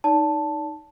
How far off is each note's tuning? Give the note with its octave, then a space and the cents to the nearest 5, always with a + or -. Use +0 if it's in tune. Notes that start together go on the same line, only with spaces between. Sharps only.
D#4 +0 D5 -35 A5 +0